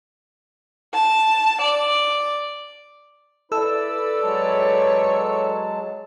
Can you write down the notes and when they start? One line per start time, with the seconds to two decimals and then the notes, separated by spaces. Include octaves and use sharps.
0.94 A5
1.61 D5
3.52 E4 A4 B4 D5 E6
4.23 F#3 G#3 C#5 A5